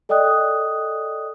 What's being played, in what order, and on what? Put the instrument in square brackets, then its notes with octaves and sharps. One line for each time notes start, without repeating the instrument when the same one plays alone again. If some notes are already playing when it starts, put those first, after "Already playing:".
[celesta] A4 D5 D#5 G5 D#6 F#6